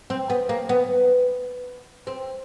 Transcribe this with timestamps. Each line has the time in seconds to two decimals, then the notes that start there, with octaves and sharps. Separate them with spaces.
0.10 C4
0.30 B3
0.49 A#3
0.69 B3
2.07 C4